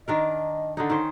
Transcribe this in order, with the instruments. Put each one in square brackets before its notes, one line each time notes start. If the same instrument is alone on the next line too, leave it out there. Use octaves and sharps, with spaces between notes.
[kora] D#3 D4 A#4 [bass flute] D#5
[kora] D3 D4 D#4
D#3 C#4 C5